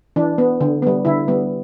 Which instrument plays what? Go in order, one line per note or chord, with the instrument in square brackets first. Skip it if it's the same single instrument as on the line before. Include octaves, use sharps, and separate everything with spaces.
[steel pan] E3 D4
B3
D3
G3 B3
D3 E4
G3 B3